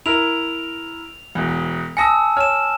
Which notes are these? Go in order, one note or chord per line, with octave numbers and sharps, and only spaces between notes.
E4 A#4 F7
E1 E2
G#5 A5 D#6 E6 A#6 C#7
C#5 F6 E7